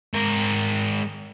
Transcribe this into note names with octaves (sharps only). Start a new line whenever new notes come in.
G#2 A#4